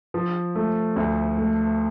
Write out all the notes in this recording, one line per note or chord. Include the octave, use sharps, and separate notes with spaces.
F3
A3
D2
A3